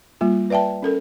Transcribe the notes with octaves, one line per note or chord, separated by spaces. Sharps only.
G3 A#3 F4
B4 D5 E5 G5 A5
C#4 A4 A#4